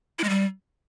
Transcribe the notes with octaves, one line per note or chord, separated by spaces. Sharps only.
E4
G#3
G3